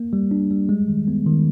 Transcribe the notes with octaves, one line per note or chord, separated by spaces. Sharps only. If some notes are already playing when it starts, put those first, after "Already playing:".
Already playing: A#3
G3
D4
G3
G#3
D#3
B3
D#3